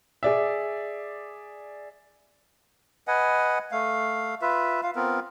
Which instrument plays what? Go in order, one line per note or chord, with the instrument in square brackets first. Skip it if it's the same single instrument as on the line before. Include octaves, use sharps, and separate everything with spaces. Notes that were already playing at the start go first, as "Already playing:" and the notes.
[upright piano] G#4 D5 E5
[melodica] B4 D#5 F#5 G#5
A3 F5
F4 B4 E5
F4 F5
B3 C4 F4 A#4